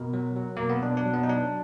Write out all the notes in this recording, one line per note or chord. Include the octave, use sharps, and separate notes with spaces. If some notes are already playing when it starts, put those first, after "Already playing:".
Already playing: B2 A#4
F#3
F#3
B2 A#3
B3
B2 D4
D4
F#3
B3
D#4
F#3 D4